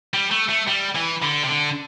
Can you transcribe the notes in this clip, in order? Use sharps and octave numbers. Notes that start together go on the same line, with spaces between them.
G3
A3
A3
G3
E3
D3
C3
D3